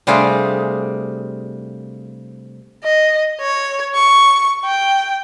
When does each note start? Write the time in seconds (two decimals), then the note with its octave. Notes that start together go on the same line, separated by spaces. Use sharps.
0.07 C3 G3 A3 D4 F4 G#4
2.84 D#5
3.41 C#5
3.95 C#6
4.65 G5